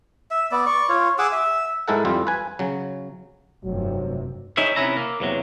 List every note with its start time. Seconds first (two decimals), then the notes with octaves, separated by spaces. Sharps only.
0.31 E5
0.52 B3 D5
0.66 D5 C#6
0.89 F4 C#5
1.18 G#4 F#5 D6 E6
1.32 E5
1.88 G#2 G#3 E4 A4 A#4 F#5
2.05 F2 G3 E4 F4
2.27 B4 G#5
2.59 C#3 F#3
3.64 F1 G2 C3 F#3
4.57 D#4 E4 G#4 C#5 E5
4.76 C3 B3 C#4 E4 A#5
4.97 A#3
5.20 E2 C3 F#3